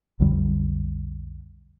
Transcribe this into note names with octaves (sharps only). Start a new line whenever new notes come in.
B1 F2 D3 G3